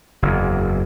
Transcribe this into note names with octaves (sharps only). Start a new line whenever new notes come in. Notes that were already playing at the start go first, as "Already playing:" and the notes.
F#1 E2